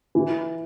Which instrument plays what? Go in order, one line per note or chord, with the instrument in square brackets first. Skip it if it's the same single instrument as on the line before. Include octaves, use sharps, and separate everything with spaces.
[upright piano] E3